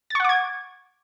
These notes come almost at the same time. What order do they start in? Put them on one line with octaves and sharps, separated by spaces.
A6 C#6 F#5 D6 G#6